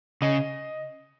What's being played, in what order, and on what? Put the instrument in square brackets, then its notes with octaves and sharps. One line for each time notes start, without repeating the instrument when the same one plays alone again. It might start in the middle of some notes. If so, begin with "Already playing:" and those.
[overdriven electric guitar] C#3 [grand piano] D#5